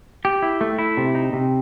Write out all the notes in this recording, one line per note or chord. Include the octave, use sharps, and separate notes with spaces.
G4
E4
A3
E4
C3
D#4
C3